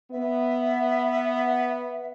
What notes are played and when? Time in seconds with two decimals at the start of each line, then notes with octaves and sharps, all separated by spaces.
0.11 B3 E5